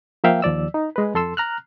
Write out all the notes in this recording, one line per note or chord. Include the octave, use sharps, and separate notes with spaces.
F3 A#3 E5 F5 G5
D#2 F3 D5 E6
D#4
G#3 B4
F2 A4 C6 E6
A#5 F6 F#6